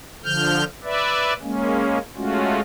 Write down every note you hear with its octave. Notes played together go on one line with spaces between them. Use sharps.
D3 F3 F6 G6
B4 D5 E5
G#3 A#3 C#4
G#3 A3 C#4 F4 F#4